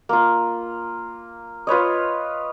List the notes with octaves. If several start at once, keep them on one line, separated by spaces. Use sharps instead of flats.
A#3 F4
F4 B4 C#5 D#5